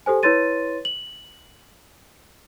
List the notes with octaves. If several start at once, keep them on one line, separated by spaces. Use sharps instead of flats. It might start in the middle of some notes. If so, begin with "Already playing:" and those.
G4 A4 C5 G#5
E4 B4 C#5 C6 A6 D#7
F#7